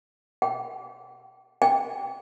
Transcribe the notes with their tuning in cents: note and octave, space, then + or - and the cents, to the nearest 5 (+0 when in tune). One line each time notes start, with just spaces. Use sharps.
G5 -30
G5 +20